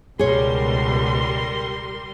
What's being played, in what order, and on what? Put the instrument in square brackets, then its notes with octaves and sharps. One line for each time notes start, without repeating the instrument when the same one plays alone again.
[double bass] C#2 B2 [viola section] G3 A#4 C6 [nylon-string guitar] G#4 C#5